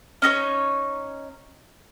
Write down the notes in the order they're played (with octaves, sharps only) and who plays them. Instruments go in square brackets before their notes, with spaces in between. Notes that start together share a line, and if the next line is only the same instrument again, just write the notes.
[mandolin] C#4 D#4 A4 C#5